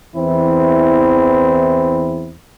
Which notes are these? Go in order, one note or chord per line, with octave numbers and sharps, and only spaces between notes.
E2 E3 C4 E4